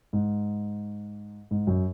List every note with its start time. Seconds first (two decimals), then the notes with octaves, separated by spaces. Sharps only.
0.13 G#2
1.51 G#2
1.67 F#2